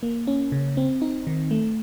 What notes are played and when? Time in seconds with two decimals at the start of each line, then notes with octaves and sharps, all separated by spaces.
0.03 A#3
0.27 C#4
0.52 C#3
0.77 C4
1.02 D#4
1.27 D#3
1.51 A3